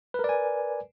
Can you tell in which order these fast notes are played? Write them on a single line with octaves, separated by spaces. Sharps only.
B4 A#4 D5 G#5